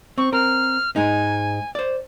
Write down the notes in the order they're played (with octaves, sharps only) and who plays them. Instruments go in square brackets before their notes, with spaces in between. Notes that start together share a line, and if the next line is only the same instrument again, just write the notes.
[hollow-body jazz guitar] C4 [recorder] C#6
[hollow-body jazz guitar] C4 A#4 [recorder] F6
[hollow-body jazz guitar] G#2 G#3 D#4 [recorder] G#5
[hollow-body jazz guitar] C5 D5